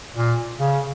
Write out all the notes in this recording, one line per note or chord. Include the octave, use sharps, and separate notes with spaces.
A#2
C#3